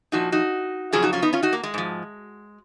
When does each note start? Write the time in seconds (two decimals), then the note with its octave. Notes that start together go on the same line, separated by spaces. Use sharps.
0.12 A#2 F3 D#4 F#4
0.32 D#4 F#4
0.92 F2 C#3 F#3 F4 G#4
1.02 D#4 F#4
1.13 C#4 F4
1.22 B3 D#4
1.33 C#4 F4
1.43 D#4 F#4
1.53 A#3
1.63 G#3
1.74 G#2 F3